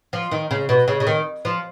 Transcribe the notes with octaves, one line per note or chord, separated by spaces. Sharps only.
F3
D#3
C#3
B2
C#3
C#3
D#3
F3